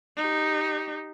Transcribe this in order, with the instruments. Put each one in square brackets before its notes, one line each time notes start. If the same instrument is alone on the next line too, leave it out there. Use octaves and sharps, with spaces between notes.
[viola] D#4 G4